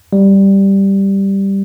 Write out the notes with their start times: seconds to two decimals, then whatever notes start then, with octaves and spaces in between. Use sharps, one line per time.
0.13 G3